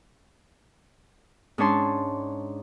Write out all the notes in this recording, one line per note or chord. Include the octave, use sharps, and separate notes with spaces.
G#2 C#4 D4 C#5 A5 C6